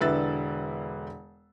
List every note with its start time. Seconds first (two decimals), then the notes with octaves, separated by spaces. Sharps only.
0.01 E1 D3 E4 B4 E6 A6